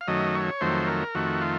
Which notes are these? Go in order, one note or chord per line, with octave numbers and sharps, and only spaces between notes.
F5
F#2 D#3 F#3 A3 D#5
C#5
F2 D#3 F#3 A3 C5
A#4
F2 D#3 A3 F#4
F4